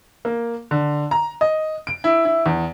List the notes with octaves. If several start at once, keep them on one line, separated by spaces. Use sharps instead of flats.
A#3
D3
A#5
D#5
D7
E4
E4
E2